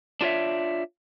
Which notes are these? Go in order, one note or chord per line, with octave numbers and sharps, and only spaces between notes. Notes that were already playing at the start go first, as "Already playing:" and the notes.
D4 F4 C#5 E5